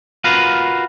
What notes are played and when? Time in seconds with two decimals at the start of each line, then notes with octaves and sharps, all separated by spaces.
0.24 F4 F#4 A#4 B4 F5